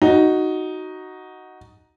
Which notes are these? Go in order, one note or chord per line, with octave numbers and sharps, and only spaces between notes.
D#4 F#4